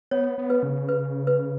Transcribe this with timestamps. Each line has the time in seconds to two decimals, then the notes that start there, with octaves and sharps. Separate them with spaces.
0.11 B3 C#5
0.38 B3
0.50 B4
0.63 C#3
0.89 B4
1.27 B4